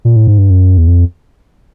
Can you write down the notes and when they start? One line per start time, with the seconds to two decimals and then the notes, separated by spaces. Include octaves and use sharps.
0.05 A#2
0.16 A2
0.27 G#2
0.38 G2
0.50 F#2
0.78 E2
0.88 F2